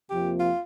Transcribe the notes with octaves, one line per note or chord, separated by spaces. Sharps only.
F2 C3 F3 A#3 G4
F4